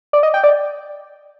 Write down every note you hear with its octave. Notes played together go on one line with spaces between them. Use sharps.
D5
D#5
G5
D5